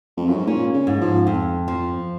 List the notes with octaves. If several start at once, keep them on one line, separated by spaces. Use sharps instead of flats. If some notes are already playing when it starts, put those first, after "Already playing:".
F2
F#2
G#2
A#2 C#4
C#3
G#2
F3
F2
F3